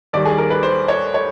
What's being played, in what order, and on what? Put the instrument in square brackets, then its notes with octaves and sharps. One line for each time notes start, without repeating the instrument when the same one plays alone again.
[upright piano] D#2 D#3 G3 D5
G#4
A#4
B4
C5
C#5
C#5